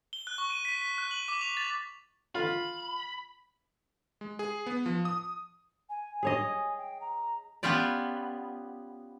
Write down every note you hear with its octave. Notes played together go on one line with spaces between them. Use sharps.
G7
F#6
C#6
D#7
B6
B6
F#6
F#7
D6
F7
A6
F4 B5
G#3
G#4
B3
F3
D#6
G#5
G#4 C#5 D#5
G5
A#5
B3 C#4 F4 G4 D5